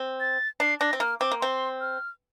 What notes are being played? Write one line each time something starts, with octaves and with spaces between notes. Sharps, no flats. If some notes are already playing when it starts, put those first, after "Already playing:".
Already playing: C4
A6
D4 C7
D4 A#6
C4
A#3 F6
C4 D6
A#3
C4 C6
F6